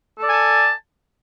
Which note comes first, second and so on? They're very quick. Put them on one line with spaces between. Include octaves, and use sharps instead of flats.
A4 D5 G#5 A5